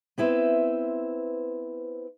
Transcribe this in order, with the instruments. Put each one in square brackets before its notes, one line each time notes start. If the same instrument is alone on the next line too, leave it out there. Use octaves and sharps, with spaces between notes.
[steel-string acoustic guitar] B3 C4 E4 B4 C5